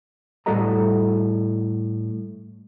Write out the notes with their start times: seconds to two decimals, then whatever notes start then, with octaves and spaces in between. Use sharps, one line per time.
0.46 A2 G3 F#4 A4 D#5 A#5